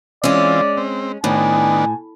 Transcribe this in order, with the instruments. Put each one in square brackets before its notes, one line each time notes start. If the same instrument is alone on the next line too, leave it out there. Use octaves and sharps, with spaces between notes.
[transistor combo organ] E3 C4 F4 [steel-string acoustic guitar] G#3 C#4 [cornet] D5
[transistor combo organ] C4
[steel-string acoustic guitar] A2 [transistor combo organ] D#3 B3 D4 [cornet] G#5